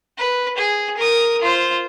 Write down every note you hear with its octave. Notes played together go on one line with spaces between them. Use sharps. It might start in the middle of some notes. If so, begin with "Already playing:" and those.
B4
G#4
A#4 D#6
F4 C5